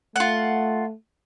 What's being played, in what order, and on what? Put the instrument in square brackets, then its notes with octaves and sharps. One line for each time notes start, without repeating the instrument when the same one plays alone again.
[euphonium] A3 [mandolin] F4 F#5